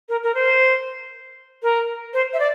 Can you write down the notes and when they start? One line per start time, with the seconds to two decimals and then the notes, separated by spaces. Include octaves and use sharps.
0.08 A#4
0.23 A#4
0.34 C5
1.62 A#4
2.13 C5
2.33 E5
2.39 D5